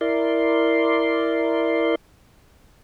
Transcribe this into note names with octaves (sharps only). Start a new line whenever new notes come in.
E4 A#4 D5 C6